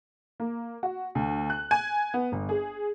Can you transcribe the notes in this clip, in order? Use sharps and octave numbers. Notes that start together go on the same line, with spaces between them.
A#3
F#4
D2
F#6
G#5
B3
G1
G#4